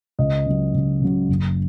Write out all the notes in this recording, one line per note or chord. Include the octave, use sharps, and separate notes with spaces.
C#2 D#5
C#3 F#3
C#2
C#3 F#3
F#1